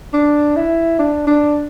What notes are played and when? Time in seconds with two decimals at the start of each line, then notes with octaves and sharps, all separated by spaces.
0.14 D4
0.56 E4
0.99 D4
1.27 D4